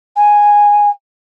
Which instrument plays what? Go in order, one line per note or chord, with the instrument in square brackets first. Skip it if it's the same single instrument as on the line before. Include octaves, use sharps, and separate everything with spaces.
[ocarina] G#5